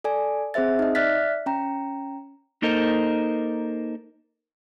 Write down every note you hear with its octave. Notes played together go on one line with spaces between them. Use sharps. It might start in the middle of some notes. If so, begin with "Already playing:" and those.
A4 D5 G#5
C4 G#4 C5 E5 A6
D#4 D#5
D5 E5 F6 F#6 A6 B6
C#4 G5 A#5
A#3 D#4 A4 A#4 C5 D#5